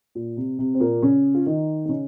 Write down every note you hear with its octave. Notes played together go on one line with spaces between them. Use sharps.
A#2
C3
C3
C4
A#2 A#3
C#3 C#4
F4
D#3 D#4
D#4
C#3 C#4